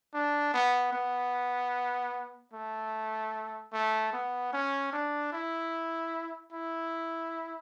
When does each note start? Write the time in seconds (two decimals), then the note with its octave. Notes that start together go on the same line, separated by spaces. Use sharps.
0.14 D4
0.54 B3
0.93 B3
2.53 A3
3.73 A3
4.13 B3
4.53 C#4
4.93 D4
5.32 E4
6.52 E4